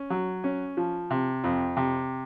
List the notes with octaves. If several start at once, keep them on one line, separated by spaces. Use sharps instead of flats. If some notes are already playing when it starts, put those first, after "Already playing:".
Already playing: C#4
F#3
C#4
F3
C3
F2
C3